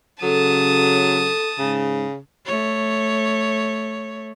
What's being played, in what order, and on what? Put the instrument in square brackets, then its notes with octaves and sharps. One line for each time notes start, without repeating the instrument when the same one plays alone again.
[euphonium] C#3 [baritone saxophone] F#3 [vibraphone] A4 [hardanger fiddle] A5 D#6
[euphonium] G#2 [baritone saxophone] C#3
[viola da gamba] A3 C#5